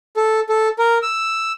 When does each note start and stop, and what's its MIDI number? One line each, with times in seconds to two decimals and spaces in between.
0.17 0.40 69
0.49 0.68 69
0.79 0.98 70
1.02 1.52 88